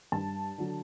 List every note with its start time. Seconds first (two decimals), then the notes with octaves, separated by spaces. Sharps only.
0.12 G2 A5
0.58 D3 F#3